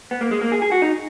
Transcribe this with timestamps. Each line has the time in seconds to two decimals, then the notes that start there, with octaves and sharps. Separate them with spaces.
0.11 B3
0.21 A#3
0.31 G#3
0.41 A#3
0.52 G#4
0.62 G#4
0.72 F#4
0.82 D#4